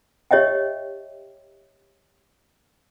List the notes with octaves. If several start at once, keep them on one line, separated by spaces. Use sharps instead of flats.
G4 C#5 D#5 E5 G5